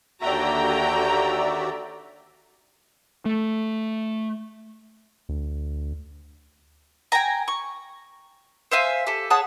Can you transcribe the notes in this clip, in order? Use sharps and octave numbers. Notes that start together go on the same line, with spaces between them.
D#2 D3 F#4 D5 E5 G5 A#5
A3
D2
G5 G#5 A#5
C#6
C5 E5 F5 G#5
G4 A4
G#4 C#5 F#5 A5